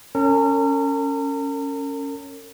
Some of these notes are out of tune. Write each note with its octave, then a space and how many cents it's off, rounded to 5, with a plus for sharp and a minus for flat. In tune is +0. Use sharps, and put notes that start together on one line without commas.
C#4 +0 A#4 -40